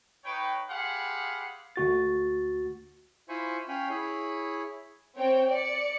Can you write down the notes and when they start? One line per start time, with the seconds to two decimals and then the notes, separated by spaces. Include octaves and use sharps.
0.24 D#4 B4 C#5 G5
0.70 G4 G#4 F5 F#5 B5 C6
1.76 D2 F#4 A6
3.29 E4 F4 C5 G#5 B5 C#6
3.68 C#4 C#5 F5 G5 G#5 B5
3.90 E4 G#4 C#5 B5
5.17 C4 C#5 G5
5.50 D5 C#7